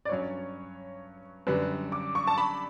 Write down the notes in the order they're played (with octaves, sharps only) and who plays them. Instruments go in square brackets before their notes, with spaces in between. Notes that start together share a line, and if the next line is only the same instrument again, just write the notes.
[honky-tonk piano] D5
[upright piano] G2 F#3 C#4 [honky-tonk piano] C#5
[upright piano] F#2 D3 G3 [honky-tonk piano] B4
[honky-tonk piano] D6
C#6
A5
B5